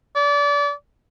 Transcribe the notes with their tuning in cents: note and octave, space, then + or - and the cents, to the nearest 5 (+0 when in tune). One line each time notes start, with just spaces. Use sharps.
D5 -30